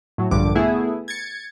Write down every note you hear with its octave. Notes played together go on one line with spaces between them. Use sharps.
A2 F#3
A#1 G2 D3 D6
A3 B3 E4 G#4
G#6 A6 C#7